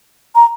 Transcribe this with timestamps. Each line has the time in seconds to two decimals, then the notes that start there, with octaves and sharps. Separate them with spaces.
0.35 A#5